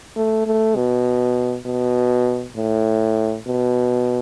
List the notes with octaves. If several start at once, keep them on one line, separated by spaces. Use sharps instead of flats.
A3
A3
B2
B2
A2
B2